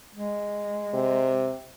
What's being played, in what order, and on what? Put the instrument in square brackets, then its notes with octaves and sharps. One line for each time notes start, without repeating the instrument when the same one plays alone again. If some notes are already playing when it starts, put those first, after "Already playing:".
[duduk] G#3
[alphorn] C3